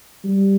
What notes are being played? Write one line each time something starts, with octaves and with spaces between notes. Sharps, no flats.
G3